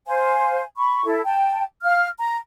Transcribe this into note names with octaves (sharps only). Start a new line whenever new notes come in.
C5 F5 G#5
B5 C#6
E4 A4
G5 A5
F5 F6
A#5